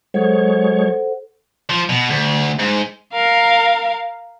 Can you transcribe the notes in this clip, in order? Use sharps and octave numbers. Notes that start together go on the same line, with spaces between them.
F#3 G#3 A4 C5 C#5 F#5
F3
B2
D2
G#2
A#4 F5